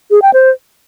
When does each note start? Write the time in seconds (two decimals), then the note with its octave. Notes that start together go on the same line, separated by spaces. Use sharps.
0.11 G#4
0.22 G5
0.33 C5